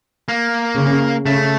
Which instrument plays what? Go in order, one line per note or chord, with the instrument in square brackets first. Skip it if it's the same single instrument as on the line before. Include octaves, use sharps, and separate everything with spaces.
[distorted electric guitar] A#3
[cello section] C#3
[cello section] C#3 [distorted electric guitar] A3